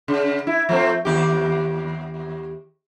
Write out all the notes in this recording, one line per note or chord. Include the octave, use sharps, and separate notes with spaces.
C#3
E4
F3 A3 C4
D#2 G4